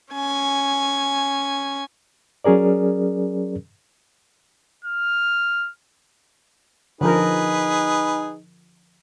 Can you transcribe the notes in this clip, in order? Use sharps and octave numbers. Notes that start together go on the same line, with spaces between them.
C#4 G#5
F#3 C#4 G#4 A#4 D5
F6
D3 F3 D#4 G#4 A#4 B4